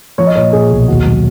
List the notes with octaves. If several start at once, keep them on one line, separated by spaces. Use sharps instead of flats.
F3 C#5
D#5
A#2 C#5
A#2 G#4
B1
D#2 F#4
F#3